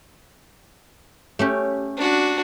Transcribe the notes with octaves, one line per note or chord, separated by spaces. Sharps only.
A3 C#4 G4
D4 F#4